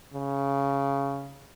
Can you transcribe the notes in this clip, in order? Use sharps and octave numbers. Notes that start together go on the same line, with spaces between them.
C#3